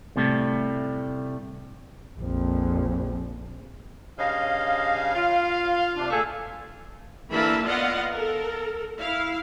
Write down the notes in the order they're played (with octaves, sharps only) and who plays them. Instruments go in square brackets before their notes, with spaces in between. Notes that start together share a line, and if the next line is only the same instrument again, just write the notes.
[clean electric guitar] A2 C3 G3 A3
[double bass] A#1 F2
[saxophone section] G2 C#3 D#5 [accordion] F5
[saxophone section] F4
[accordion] C3 D4
[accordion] A#2 [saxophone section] A3 G#4 A4
[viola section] D3 E3 A#3 E5 A5 B5
B3 F4 D5 D#5 F5 F#5
A4 A#4
E4 F5